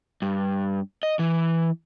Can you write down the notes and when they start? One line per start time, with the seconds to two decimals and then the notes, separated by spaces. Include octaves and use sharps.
0.22 G2
1.03 D#5
1.19 E3